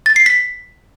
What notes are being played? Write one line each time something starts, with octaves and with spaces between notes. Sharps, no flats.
A6
C7
B6